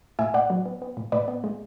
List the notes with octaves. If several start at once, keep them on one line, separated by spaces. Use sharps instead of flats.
A2 E5 G#5
A2 D5 F#5
F#3
B3
B3
A2
A2 B4 D5
B3
G#3